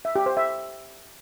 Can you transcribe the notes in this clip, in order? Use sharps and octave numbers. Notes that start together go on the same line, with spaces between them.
E5
G4
C5
E5